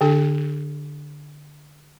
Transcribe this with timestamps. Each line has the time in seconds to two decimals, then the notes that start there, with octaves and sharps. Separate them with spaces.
0.01 D3 D4 A4